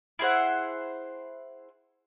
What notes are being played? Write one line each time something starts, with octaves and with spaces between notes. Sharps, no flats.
E4 G#4 C5 F#5